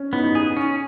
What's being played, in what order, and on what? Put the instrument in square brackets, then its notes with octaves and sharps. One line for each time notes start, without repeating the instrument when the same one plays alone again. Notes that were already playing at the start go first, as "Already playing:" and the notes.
Already playing: [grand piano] C#4
[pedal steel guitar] B3 [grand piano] D#4
[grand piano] D#4
[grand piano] D#4 [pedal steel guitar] G#4
[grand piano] D#4
[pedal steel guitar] C#4